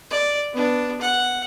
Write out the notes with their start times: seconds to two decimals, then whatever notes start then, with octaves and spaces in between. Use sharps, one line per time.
0.11 D5
0.53 B3 D4
1.01 F#5